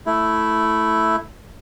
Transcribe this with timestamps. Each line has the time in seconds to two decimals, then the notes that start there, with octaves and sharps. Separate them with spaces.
0.06 A3 E4